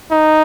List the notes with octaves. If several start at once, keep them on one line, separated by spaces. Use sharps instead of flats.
D#4